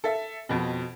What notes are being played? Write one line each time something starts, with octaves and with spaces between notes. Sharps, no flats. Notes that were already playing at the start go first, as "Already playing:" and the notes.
A4 E5
F2 B2